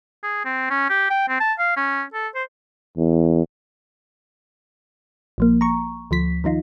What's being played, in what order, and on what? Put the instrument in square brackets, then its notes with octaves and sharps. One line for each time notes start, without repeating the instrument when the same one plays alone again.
[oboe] G#4
C4
C#4
G4
G5
C4
A5
F5
C#4
A4
C5
[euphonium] E2
[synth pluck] A#1 F3 A#3
A#5 C#6
D2 F3 B6
D#3 F3 D#4 F4